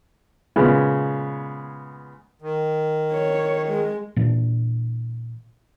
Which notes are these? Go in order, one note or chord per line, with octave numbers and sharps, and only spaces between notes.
A#2 C#3 G#3 B3
D#3
C#5
G#3
A#2 E3 D4